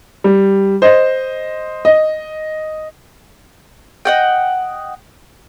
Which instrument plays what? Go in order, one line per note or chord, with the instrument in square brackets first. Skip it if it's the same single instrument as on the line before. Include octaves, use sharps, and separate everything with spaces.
[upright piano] G3
C5 D#5
D#5
[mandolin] D#5 F#5 G5